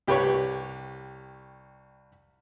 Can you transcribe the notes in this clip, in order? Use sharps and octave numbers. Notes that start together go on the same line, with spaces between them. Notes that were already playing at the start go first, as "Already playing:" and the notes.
C2 G4 B4 C#5 C#6